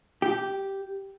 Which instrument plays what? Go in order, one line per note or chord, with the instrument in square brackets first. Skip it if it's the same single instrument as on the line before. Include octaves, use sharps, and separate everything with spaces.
[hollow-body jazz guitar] G4